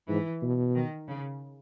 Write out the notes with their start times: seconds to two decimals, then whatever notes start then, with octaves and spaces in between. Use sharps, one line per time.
0.09 G#2 E3
0.42 B2
0.75 D#3
1.08 C#3